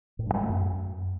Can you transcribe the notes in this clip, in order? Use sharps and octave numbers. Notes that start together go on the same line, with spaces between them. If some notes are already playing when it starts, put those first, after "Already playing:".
A2
G2
G#3
A3
F#2